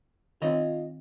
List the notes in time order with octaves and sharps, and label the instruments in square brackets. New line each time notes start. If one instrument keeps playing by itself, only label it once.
[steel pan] D#3 C4 [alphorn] F4 [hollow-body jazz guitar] C#5 D#5